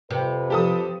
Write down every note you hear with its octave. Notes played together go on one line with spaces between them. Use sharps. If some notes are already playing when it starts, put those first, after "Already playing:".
F2 C3 B4
F3 G4 A4 D#6